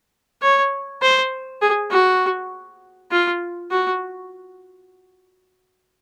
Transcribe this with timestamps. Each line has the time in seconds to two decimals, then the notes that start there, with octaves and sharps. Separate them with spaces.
0.42 C#5
1.02 C5
1.62 G#4
1.91 F#4
3.11 F4
3.71 F#4